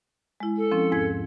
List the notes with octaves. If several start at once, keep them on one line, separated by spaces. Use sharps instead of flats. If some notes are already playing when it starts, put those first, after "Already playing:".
G#3 E4
A4
F3 C4 C#4
E2 G#2 G#6